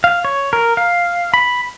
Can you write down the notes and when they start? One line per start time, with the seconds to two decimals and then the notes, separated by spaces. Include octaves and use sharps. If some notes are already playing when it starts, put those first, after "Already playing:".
0.04 F5
0.25 C#5
0.53 A#4
0.77 F5
1.34 B5